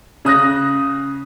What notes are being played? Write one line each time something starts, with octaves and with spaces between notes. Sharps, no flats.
C#3 D#6 F#6 A#6